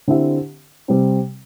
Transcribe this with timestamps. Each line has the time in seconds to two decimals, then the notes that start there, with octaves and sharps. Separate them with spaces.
0.08 D3 C4 E4 G4 E5
0.88 C3 G3 C4